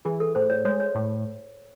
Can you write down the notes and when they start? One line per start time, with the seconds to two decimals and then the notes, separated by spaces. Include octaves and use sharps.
0.05 E3 G#4
0.20 A4
0.35 A2 C5
0.50 C#5
0.65 G#3 C#5
0.80 C#5
0.95 A2